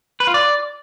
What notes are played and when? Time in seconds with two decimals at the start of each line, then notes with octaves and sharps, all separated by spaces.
0.20 B4
0.27 F4
0.34 D5